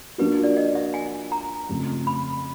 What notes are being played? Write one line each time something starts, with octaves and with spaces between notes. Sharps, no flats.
F3 A#3 D4 F#4 B4
D5
D#5
E5
G#5
A#5
F2 C#3 F3 A3
B5